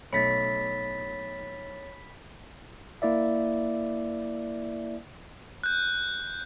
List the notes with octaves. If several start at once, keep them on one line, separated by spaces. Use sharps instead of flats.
B1 A3 C#5 B5 A6 B6 C#7
A#3 E4 D5 E5
F#6 G6